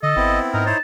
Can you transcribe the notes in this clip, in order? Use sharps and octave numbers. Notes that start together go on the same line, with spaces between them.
D3 A4 D#5
G#1 B3 C4 E4
G#2 D#4 A#4
E4 C5 C#5 A5